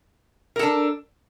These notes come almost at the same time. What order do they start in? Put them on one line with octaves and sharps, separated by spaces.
A#4 A4 D4